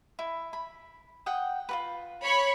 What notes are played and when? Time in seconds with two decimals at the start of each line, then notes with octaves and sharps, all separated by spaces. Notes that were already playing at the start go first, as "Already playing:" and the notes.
0.19 E4
0.53 B5
1.26 F#5 G5 D#6
1.69 F4 F#4 B4
2.23 C#5 B5 C#6